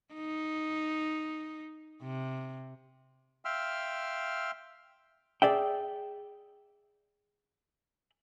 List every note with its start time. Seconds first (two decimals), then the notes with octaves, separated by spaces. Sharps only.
0.14 D#4
2.02 C3
3.45 E5 F5 G5 C6 E6 F6
5.42 G#4 D5 E5 G5